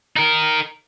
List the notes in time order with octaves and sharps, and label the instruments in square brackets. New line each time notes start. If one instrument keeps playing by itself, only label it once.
[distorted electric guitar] D#4 A#4